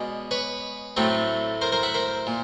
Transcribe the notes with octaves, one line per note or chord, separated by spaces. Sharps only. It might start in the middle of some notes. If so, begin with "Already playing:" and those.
Already playing: B2 G#3 C#4 D5
B4 C#5
A2 F#3 A3 C4
A#4 C5
A#4 C5
E5 F#5
A#4 C5
A#2